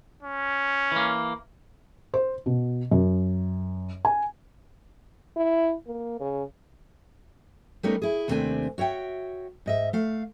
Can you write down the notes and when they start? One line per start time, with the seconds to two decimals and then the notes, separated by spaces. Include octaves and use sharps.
0.23 C#4
0.92 E3 A#3
2.14 C5
2.46 B2
2.91 F#2
4.05 G#5
5.36 E4
5.87 A#3
6.20 C#3
7.83 G3 A3 B3 C#4 D#4 A#4
8.02 E4 G#4
8.28 D#2 C3 A3 C4 D4 G#5
8.78 F#4 C#5 E5 G5
9.66 G#2 D#5 E5
9.93 A3 F5